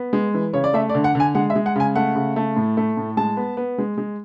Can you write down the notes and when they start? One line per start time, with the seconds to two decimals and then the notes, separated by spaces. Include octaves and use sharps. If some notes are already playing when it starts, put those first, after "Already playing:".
Already playing: B3
0.13 G#3
0.34 E3
0.53 C#3 C#5
0.64 D5
0.74 A3 E5
0.89 D5
0.95 D3
1.04 F#5
1.15 D3 G#5
1.35 G#3 F#5
1.50 E5
1.55 G#3
1.66 F#5
1.76 C#3 G#5
1.96 A3 F#5
2.15 C#3
2.36 A3
2.56 A2
2.77 A3
2.97 A2
3.17 G#3 A5
3.37 B3
3.57 B3
3.78 G#3
3.98 G#3